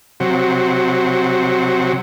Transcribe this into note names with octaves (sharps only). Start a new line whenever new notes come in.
C3 F#3